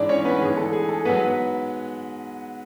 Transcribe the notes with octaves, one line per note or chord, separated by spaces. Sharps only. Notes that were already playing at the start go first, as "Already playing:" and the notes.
Already playing: G#2 E3 D4 D5
C#4 C#5
B3 B4
G#2 E3 G#4
A4
G#4
A4
G#2 F#3 B3 B4